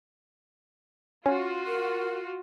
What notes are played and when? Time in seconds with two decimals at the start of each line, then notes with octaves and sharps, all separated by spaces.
1.26 C#4 F4 F#4
1.67 A#4